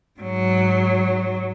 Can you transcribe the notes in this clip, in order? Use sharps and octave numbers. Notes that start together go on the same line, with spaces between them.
G#2 F#3